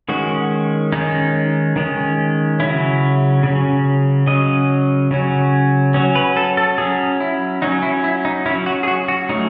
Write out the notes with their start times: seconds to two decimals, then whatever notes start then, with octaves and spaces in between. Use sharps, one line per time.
0.09 D#3 G#3 C#4 F#4
0.92 D#3 G#3 C#4 D#4
1.76 D#3 G#3 C#4
2.60 C#3 F#3 C#4 E4
3.43 C#3 F#3 C#4
4.27 C#3 F#3 C#4 D#5
5.11 C#3 F#3 C#4
5.94 F#3 C#4
6.15 B4
6.37 A4
6.57 A4
6.78 F#3 C#4 G#4
7.20 E4
7.62 F#3 C#4 D#4
7.83 E4
8.04 E4
8.25 D#4
8.46 C#4 E4
8.49 F#3
8.66 F#4
8.83 G#4
8.88 F#4
9.08 F#4
9.29 F#3 A3 C#4 D#4